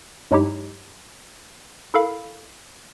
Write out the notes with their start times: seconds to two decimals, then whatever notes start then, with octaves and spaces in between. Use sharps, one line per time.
0.31 G2 F#3 G#3 D#4 E4 G4
1.94 E4 A4 A#4 F5 B5